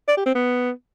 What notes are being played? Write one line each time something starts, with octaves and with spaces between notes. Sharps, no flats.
D5
G4
C4
B3